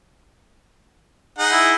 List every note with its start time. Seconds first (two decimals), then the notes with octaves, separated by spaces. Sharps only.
1.38 D#4 G#4 F#5
1.52 E4